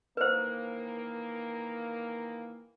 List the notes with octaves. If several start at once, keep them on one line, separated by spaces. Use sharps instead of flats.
D#3 E3 A#3 B4 C5